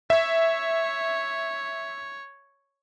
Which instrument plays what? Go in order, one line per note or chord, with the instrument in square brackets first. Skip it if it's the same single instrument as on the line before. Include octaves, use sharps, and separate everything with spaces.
[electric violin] C#5 [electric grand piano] E5